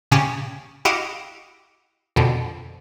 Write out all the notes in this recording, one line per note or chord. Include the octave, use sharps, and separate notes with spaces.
A#2 C#3 C#4 G4 G#4
E4 F#4 G4 D#5 F5
F2 B2 D3